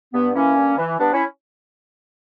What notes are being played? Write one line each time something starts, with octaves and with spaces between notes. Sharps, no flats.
G2 B3
E3 A#3 C#4
G2
E3
G2 B3 D4
C#4 E4